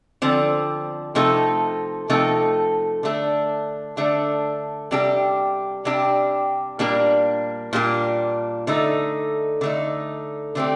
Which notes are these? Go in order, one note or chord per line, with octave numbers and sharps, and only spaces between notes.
D3 F3 C4
C3 F3 A3 D#4 A4
C3 F3 A3 D#4 A4
D3 A3 D4
D3 A3 D4
C3 G3 D4 G4
C3 G3 D4 G4
A#2 G3 A#3 D4
A#2 G3 A#3 D4
D3 A3 D#4
D3 A3 D#4
D3 A3 C4 G4